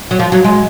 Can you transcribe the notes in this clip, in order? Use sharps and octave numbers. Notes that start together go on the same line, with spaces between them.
F#3
F3
F#3
G#3